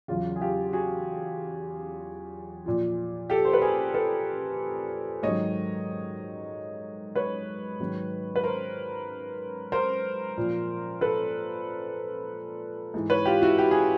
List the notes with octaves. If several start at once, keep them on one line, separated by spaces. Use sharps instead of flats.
E2 C#3 F#3 F4
G#4
F4 G4
F#4 G#4
A#2 F3
G4 A4
C5
B4
G#4 A#4
A4 B4
G#2 D#3 F#3 C#5 D#5
B4 C#5
G#2 D#3 F#3
B4
A#4 C5
A#4 C5
A#2 F3
A4 B4
G#2 E3
B4 C#5
F4 G4
E4 F#4
G4
G#4